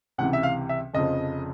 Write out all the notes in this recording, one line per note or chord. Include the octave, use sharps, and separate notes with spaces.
C#2 C3 E3 F#5
E5
F5
E5
F1 F2 C#3 F3 D#5